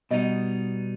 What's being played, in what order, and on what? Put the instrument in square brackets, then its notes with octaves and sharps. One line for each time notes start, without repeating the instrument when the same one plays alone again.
[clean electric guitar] B2 G3 B3 D#4 [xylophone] D#5